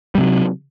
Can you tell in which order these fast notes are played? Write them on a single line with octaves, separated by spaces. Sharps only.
G3 C3 F#3